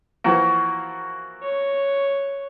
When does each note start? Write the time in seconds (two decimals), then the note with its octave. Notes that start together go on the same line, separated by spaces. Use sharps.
0.24 E3 F3 A#3 F#4
1.43 C#5